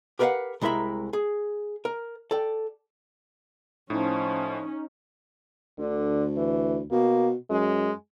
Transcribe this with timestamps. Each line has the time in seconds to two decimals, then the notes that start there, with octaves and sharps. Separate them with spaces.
0.19 G4 A#4 B4 D#5 F5 F#5
0.61 C2 G#3 E4 A#4 E5 B5
1.13 G#4
1.85 A#4
2.31 A4 D5 G5
3.90 A2 F3 C#4 D#4
5.79 D2 D3
6.37 E3
6.92 B2 A#3
7.50 F#2 G#3